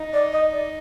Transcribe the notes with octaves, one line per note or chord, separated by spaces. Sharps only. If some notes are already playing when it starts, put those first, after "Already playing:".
Already playing: D#4
D5
D#5
D5